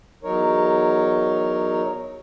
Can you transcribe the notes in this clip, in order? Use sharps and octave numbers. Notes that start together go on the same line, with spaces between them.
E2 F#3 D#4 A#4 C#5